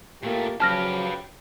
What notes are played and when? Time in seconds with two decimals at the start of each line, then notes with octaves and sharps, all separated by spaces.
0.23 A#2 A3 A#3 G4
0.60 C#3 F3 F#3 G4 B4 A5 F6 A#6